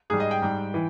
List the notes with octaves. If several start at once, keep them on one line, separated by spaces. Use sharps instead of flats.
G#2 G3 G#4
D#5
G5
G#2 G3
E3